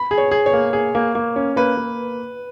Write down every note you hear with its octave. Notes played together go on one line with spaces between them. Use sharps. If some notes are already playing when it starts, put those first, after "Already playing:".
Already playing: B5
G#4
C#5
G#4
C#5
A#3
G#4
A#3
A#3
C#4
A#3 B4
A#3